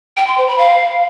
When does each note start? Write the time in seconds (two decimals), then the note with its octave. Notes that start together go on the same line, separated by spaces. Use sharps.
0.17 G5
0.27 C6
0.37 C5
0.48 B5
0.58 F5